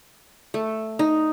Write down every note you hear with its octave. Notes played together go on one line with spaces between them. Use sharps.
A3
D#4